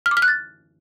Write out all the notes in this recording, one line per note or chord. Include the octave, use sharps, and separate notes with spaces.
F6
D6
F6
F#6
A6